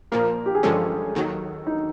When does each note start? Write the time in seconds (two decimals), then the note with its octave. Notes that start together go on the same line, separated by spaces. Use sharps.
0.12 A#2 F3 A#3 A#4
0.46 G4
0.55 G#4
0.63 G2 D3 F3 G#3 C#4 A4
1.15 D#2 D#3 F#3
1.67 D#4